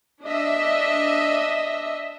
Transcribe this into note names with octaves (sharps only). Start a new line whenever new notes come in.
D4 D#5 E5